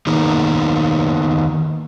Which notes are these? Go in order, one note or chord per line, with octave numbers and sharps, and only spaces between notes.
D#3 A#3 B3 D#4 G#4